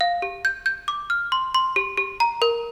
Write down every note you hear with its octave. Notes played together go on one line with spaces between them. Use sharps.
F5
G4
G6
G6
D6
F6
C6
C6
G4
G4
A#5
A#4